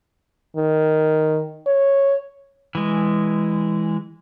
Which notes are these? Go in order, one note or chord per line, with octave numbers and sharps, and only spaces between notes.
D#3
C#5
E3 G#3